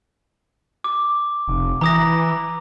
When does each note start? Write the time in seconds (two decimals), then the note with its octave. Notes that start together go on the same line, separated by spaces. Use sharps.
0.84 D6
1.48 F1
1.81 E3 A#5 D#6 A#6